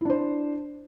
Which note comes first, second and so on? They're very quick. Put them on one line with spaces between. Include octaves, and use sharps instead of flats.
E4 D4 C5